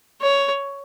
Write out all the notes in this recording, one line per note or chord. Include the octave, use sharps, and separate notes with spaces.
C#5